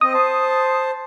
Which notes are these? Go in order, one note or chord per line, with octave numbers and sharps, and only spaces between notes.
C4 D#5 D#6
C5 A5